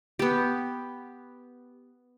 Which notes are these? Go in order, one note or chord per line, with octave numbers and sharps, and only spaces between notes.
B3 G4